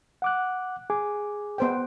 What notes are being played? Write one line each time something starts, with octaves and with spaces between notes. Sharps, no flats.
F#5 D6 F#6
G#4 G#5 D6
B3 C5 G5